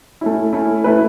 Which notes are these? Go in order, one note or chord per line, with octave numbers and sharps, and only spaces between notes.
A3 C#4 E4
A3 C#4 E4
A3 E4 B4